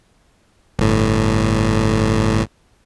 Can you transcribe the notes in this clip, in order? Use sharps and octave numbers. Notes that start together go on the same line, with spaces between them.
G1 A2